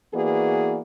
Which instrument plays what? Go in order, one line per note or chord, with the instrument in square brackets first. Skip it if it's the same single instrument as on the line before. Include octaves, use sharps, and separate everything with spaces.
[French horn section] E3 A#3 B3 F#4 G#4 D5